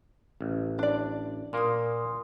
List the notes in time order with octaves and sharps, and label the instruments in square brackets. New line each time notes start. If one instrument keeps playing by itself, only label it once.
[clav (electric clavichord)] A1
[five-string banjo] D4 D5
[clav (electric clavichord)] A#2 A#3 [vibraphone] C6 D#6